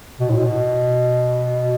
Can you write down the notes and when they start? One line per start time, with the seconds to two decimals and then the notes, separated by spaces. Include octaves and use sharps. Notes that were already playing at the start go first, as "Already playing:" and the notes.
0.20 B2
0.30 A2
0.39 B2